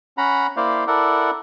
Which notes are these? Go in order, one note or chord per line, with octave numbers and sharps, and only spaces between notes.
C#4 F#5 A#5 B5
A#3 E4 C5 D5 F5
E4 A4 A#4 D5 F#5